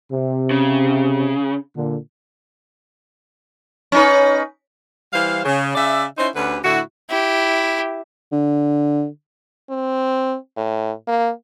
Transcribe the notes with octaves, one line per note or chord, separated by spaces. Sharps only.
C3
C#3
A#2 D3
C#4 D#4 B4
E3 G3 C5 F5
C#3
C#3 D5 E5
C#4 D#4 E4 C5
D2 D3 C#4 G4 B4
A2 D3 E4 F#4
E4 G4
D3
C4
A2
A#3